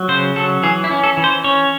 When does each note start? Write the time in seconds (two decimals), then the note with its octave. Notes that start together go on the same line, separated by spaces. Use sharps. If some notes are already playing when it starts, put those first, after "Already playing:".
Already playing: F#3
0.08 C#3 C5
0.36 F#3 A4
0.63 E3 G#4
0.84 E4
0.91 C#4
1.03 A4
1.17 E3
1.24 C5
1.44 C#4 C#5